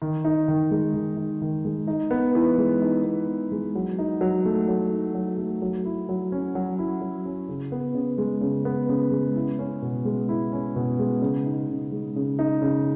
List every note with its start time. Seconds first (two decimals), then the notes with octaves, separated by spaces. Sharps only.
0.02 D#3
0.25 D#4
0.48 D#3
0.71 G#3
0.94 D#3
1.17 D#4
1.42 D#3
1.65 G#3
1.87 D#4
2.11 B3
2.35 E3
2.58 G#3
2.82 D#4
3.04 B3
3.27 E3
3.52 G#3
3.75 F#3
3.99 D#4
4.21 F#3
4.45 A3
4.68 F#3
4.91 D#4
5.14 F#3
5.38 A3
5.62 F#3
5.85 E4
6.09 F#3
6.32 C#4
6.55 F#3
6.79 E4
7.01 F#3
7.26 C#4
7.49 C#3
7.72 B3
7.95 C#3
8.18 G#3
8.41 C#3
8.65 B3
8.89 C#3
9.11 G#3
9.35 E4
9.59 C#4
9.82 B2
10.05 G#3
10.29 E4
10.53 C#4
10.76 B2
10.99 G#3
11.22 C#3
11.46 D#4
11.68 C#3
11.92 G#3
12.16 C#3
12.39 D#4
12.62 C#3